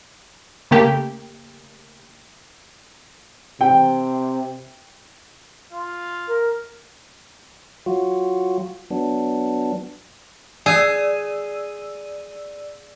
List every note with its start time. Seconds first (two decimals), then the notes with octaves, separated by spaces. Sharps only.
0.71 C#3 A3 A#3 G4
3.61 C3 G5
5.73 F4
6.28 A#4
7.86 F#3 F4 F#4
8.90 F#3 B3 D4
10.66 G#4 D5 E6 D#7